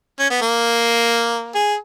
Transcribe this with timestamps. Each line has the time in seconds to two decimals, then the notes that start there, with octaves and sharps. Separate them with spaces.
0.19 C#4
0.30 B3
0.42 A#3
1.55 G#4